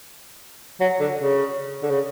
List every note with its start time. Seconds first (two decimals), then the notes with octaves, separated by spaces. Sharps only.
0.80 F#3
1.00 D3
1.19 C#3
1.82 D3
1.90 C#3